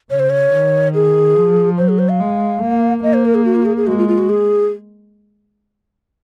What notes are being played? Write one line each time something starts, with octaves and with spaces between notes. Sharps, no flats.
C#3 C#5
C5
C#5
D#3
G#4
F3
F#3 C5
G#4
C5
F5
G#3
A#3
A#3 D#5
C5
A#4
G#4
F#4
F4
F#4
G#4
G#4
G#3 F#4
F4
F4
F#4
G#4